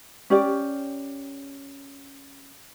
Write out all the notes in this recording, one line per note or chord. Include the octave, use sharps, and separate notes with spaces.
C#4 G4 D5